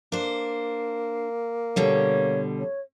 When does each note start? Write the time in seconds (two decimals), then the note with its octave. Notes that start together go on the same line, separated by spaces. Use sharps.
0.12 A#3 D4 C5
1.76 B2 D3 G3 C#5
2.59 C#5